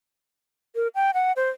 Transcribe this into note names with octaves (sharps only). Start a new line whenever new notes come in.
A#4
G5
F#5
C5